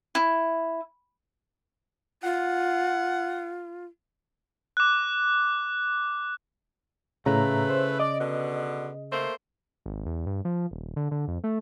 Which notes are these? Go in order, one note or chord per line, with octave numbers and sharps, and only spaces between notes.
E4
F4 F#5
D6 F#6
A2 C#3 A3 E4 B4 A#5
C5
D5 D#5
B2 D3 B3
A3 A#3 C5
G#1
E2
G2
F3
D#1
D3
D3
F2
A3